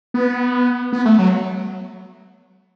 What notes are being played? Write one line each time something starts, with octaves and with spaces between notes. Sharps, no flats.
B3
B3
A3
F#3